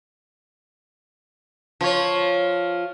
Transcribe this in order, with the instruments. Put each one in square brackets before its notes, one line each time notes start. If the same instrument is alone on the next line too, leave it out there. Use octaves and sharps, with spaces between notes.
[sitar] F3 C#5